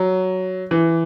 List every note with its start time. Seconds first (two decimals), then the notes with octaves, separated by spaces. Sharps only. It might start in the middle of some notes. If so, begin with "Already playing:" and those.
Already playing: F#3
0.71 E3